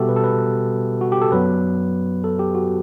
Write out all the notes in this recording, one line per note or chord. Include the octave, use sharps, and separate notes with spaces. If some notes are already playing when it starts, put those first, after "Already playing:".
Already playing: B2 G3 B3 F#4 G4 A4 E5
B4
A4
B4
F#4
G4
A4
F#2 F#3 B3 B4
A4
G4
F#4